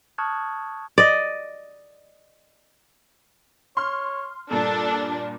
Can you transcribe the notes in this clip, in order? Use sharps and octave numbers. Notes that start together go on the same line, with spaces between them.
A5 C#6 D#6 F6 F#6 G#6
D5 D#5
C#5 C6 F6
G2 A#2 D4 A4